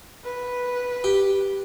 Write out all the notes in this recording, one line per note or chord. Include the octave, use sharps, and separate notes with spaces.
B4
G4